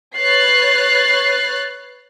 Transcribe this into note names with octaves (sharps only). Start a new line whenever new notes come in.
B4 C#5 F#6 A6 C7